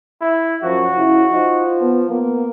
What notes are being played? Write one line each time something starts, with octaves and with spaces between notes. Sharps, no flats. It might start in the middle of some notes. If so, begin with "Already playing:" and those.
E4
F#2 F3 F#4
C#3 E4
F3 D#4
B3
A#3 B3